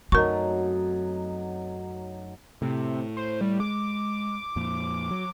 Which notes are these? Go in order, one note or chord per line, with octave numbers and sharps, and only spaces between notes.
F#2 F#3 A3 C4 D#4 A#4 C#6
A2 C3
C5
G3
G#3 D6
F2 A#2
F#3